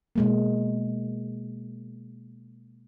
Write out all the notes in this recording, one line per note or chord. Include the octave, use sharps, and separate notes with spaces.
B2 G#3 A#3